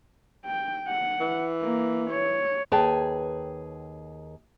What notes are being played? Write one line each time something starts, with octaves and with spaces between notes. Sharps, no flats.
G5
F#5
E3
A#3
C#5
D#2 G#4 B4 C#5 G5 A5